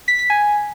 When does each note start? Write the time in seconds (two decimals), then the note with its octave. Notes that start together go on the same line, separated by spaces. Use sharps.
0.08 B6
0.19 B6
0.30 G#5